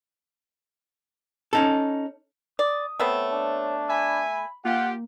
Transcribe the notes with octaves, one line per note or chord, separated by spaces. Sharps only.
C#4 D#4 A4
D5 D#6
A3 B3 C4 C#5
D4
E5 G#5 B5
A#3 F4 G4 F#5